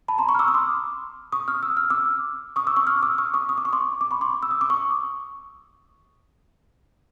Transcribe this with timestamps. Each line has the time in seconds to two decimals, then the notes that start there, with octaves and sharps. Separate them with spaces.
0.08 A5 B5
0.18 A#5 C6
0.29 B5 C#6
0.35 F6
0.39 D6 E6
0.48 D#6
0.54 C6 D6
1.32 C#6 D#6
1.48 D#6 F6
1.63 E6
1.77 F6
1.90 D6 E6
2.56 C#6 D#6
2.67 D6 E6
2.76 C#6 D#6
2.87 D#6 F6
3.03 D6 E6
3.18 C#6 D#6
3.34 C#6 D#6
3.49 D#6
3.58 D6
3.65 C#6
3.73 C6 D6
4.01 D6
4.11 B5 C#6
4.21 C6 D6
4.43 E6
4.51 D#6
4.61 D6
4.70 C#6 D#6